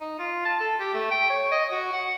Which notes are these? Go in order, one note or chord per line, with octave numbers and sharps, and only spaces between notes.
D#4
F4
A5
A4
G4
A3
G5
C#5
D#5
F#4
F#5